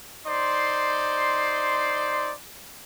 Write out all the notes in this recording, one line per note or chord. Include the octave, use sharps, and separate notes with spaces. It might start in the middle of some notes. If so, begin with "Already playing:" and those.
D#4 C5 D5 C6